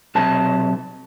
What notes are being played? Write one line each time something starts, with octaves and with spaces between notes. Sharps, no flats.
B1 C3 A5